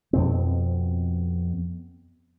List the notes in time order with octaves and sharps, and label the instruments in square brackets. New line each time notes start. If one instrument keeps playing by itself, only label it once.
[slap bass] F2 B2 C4